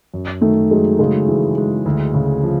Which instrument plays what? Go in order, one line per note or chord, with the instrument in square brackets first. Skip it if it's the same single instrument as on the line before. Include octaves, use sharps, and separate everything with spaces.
[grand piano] F#2
[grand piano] D#3 [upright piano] A3
[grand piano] F#3 [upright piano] G#3
[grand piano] C#3 [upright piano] G#3
[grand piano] E3
G#3
D2
C#3
F3